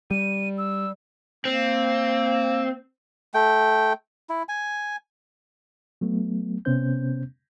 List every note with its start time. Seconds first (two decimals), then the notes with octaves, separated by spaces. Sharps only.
0.11 G3 D#7
0.58 E6
1.45 A#3 C4
3.34 A3 G5
4.29 E4
4.49 G#5
6.01 F#3 A3 B3
6.65 C3 B3 C#4 C5 G6